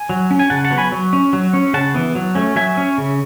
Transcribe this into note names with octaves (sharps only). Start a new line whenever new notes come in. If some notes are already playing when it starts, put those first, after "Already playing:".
Already playing: G#5
F#3
C#4
G#5
C#3 F#5 A5
F#5 A5
F#3 B3
G#5 B5
F#3
C#4
F#3
C#4
C#3 F#5 A5
E3 B3
F#3
A3 C#4
F#3 E5 G#5
C#4
C#3